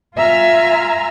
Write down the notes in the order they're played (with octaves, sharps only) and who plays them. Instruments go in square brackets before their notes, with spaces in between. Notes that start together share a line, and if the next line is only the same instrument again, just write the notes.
[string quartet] F4 E5 G#5 A#5 F6